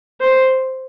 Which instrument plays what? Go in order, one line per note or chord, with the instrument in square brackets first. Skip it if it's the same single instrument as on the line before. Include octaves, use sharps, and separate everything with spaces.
[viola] C5